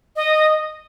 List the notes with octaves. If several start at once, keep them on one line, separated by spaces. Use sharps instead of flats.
D#5